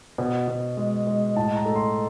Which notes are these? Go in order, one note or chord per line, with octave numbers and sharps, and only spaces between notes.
B2
B2
G#3
G#3
A2 A5
A#5
A3
C6